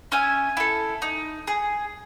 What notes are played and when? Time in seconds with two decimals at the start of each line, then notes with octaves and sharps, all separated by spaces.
0.12 C#4 E5 G#5
0.57 E4 A4
1.02 D#4
1.47 G#4